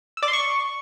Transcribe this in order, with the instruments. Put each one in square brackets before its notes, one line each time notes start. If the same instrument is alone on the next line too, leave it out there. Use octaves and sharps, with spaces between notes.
[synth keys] E6
D5
C6
C#6